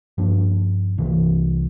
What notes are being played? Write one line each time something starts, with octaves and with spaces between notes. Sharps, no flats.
G2 F3 A#3 D4
C2 C3 E3